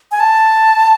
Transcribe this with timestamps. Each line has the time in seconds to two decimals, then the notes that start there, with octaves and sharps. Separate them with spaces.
0.12 G#5
0.20 A5